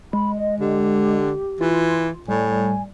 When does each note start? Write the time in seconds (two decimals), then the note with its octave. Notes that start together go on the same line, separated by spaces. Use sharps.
0.13 G#3 B5
0.38 D#5
0.60 D3 G4
1.61 E3 F4
2.28 A2 G3 G#5